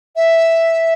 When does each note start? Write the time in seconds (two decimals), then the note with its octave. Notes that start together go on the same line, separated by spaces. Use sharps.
0.16 E5